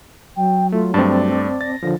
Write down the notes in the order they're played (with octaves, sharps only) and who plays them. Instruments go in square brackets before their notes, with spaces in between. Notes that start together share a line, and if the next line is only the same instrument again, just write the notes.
[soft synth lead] F#3 [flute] G5
[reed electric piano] A3 [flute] F4
[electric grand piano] G2 A3 [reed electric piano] C4 A5 [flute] D5
[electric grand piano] A6 [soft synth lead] A#6
[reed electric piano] D3 F3